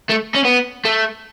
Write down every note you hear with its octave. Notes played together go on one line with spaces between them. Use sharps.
A3
C#4
B3
A3